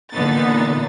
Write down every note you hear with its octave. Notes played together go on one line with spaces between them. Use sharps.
A#2 D3 E3 B3 D#4 A6